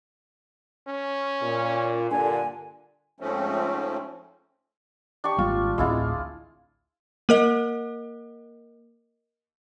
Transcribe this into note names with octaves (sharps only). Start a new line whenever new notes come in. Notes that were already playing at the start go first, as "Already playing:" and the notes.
C#4
A#2
G2 A#2 D3 G#5
G#2 F3 A3 C4 C#4
D4 G4 C#6
G#1 G3 A#3 F4
A1 D2 G#3 C4 E4 F4
A#3 A#4 D#5